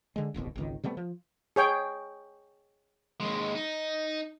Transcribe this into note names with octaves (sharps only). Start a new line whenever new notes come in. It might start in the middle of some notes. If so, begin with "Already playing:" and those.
D3 G#3
D1 G1 C2 B2
G#1 C#2 D#3
C3 G3 A3 B3
F3
G#4 C#5 G5
D#2 G#3
D#4